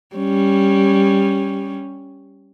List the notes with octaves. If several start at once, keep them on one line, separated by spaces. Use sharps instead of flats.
G3 C#4